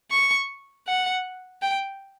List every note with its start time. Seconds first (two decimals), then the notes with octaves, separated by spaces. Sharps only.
0.11 C#6
0.87 F#5
1.62 G5